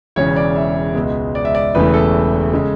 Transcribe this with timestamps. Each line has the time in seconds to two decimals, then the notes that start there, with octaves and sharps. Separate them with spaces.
0.16 E1 E2 C#3 C#5
0.36 D5
0.56 E5
0.95 C#2 B2 G#3
1.35 D5
1.45 E5
1.55 D5
1.75 E1 E2 C#3 E3 A3 B4
1.94 A4
2.53 C#3 G#3